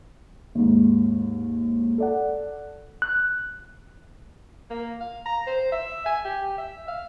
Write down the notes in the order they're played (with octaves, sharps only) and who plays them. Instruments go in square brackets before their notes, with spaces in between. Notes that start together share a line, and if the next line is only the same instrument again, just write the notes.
[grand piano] D#2 G#2
A4 D5 F#5
[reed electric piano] F#6
[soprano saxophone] A#3
F5
A#5
C5
E5
G#5
G4
E5
F5